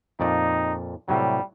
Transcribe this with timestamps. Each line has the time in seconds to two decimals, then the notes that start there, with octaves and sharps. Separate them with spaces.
0.20 F2 A#2 D#4 D5
1.09 A2 C3 F#3 G3